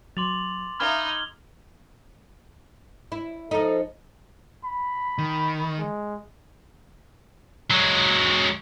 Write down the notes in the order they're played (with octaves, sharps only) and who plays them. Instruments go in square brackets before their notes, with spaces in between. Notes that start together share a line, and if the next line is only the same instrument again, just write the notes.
[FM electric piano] F#3 [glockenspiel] C6 D6 A6 [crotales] F7 F#7
[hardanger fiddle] D#4 [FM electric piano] E5 F5 B5 [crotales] F6 G#6 G7
[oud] E4
[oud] F3 D#4 [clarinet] A4
[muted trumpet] B5
[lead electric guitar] D#3
[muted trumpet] G#3
[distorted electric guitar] F#3 G#3